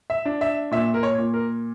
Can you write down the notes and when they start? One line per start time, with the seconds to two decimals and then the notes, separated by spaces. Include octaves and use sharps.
0.10 E5
0.25 D4
0.41 E5
0.71 A#2 E5
0.94 A#4
1.03 C#5
1.18 A#2
1.34 A#4